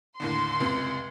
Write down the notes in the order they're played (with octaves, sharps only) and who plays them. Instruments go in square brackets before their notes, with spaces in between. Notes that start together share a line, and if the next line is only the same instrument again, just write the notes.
[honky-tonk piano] D#2 A2 D3 [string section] C6
[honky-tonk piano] F1 C#2 C3